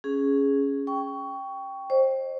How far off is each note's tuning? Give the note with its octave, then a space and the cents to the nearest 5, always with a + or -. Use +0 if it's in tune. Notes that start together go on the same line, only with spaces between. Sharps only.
C#4 +0 G#4 +0
G5 +0 C#6 +15
C5 +25 D#5 -20